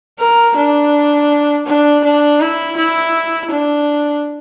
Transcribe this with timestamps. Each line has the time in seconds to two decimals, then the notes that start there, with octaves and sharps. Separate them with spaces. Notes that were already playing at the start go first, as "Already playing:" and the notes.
0.19 A#4
0.56 D4
1.66 D4
2.04 D4
2.40 E4
2.77 E4
3.51 D4